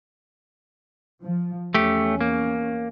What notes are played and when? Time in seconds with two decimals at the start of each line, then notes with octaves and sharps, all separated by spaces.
1.22 F3
1.74 E2 A3 C#4 G4
2.21 A#3